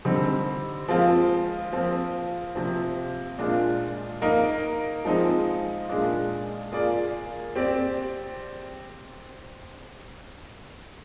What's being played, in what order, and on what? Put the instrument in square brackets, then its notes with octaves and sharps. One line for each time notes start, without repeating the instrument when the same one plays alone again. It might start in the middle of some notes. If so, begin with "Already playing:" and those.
[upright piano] D3 G3 C4 D#4
F3 G#3 C4 F4
F3 C4 F4
C3 F3 C4
A#2 G#3 D4 F4
A#3 D#4 A#4
F3 G#3 C4 D#4
A#2 G#3 D4 F4
A#3 F4 G#4 D5
C4 G4 D5